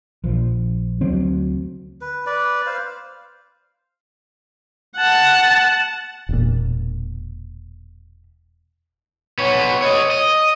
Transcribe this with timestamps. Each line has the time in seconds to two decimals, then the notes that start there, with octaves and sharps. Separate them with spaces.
0.24 A#1 F3
1.01 D2 D3 F#3 C4
2.01 B4
2.26 B4 D5
2.66 C5 F5
4.96 F#5 A5
6.29 E1 A#2
9.38 B3 C#5
9.82 C#5 D#5
10.11 D#5